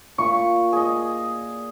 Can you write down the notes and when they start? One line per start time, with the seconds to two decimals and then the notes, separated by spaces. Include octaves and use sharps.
0.18 A#2 E4 C#6
0.73 G#4 D#5